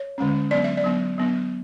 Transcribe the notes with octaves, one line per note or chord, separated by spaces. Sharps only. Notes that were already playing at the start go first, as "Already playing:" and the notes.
Already playing: C#5
D3 G#3 C#4
F#3 B3 D4 D5
E5
D5
F#3 B3 D4
F#3 B3 D4